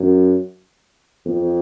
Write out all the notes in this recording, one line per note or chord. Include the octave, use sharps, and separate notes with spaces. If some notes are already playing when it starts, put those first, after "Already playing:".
Already playing: F#2
F2